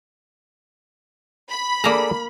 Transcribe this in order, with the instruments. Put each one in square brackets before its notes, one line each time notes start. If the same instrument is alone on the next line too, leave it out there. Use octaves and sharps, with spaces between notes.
[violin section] B5
[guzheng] A#3 A#5 [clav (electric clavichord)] G#4 A4 D5